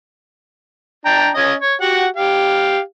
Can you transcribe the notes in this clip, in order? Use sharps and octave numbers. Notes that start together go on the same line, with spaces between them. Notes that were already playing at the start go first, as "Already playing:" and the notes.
D4 G5 A#5
C#4 D#5
C#5
F#4 G4 F#5
G4 F5